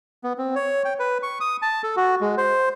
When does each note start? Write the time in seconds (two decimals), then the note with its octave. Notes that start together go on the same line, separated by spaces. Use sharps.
0.24 B3
0.38 C4
0.55 C#5
0.85 G5
0.99 B4
1.23 C#6
1.41 D#6
1.62 A5
1.83 A4
1.97 F#4
2.21 G#3
2.38 C5